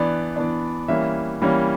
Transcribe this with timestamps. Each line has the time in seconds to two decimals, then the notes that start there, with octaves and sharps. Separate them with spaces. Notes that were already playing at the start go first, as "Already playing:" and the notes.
Already playing: E3 B3 D4 D5
0.36 E3 B3 D4
0.88 E3 G3 A#3 C#4 E5
1.41 E3 G3 A#3 C#4